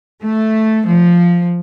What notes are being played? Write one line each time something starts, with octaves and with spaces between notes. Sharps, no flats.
A3
F3